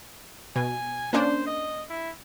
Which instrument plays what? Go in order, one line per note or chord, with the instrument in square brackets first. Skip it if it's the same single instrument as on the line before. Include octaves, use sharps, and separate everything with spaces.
[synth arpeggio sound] B2 [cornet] G#5
[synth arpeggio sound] A#3 C#4 D4 [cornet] C5
[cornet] D#5
E4